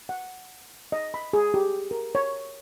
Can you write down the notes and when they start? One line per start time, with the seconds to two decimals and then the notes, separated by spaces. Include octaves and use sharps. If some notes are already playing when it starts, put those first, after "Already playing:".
0.09 F#5
0.92 D#5
1.14 B5
1.33 G#4
1.54 G4
1.91 A#4
2.15 C#5